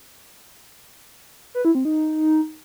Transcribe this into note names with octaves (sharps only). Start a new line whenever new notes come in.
B4
E4
C4
D#4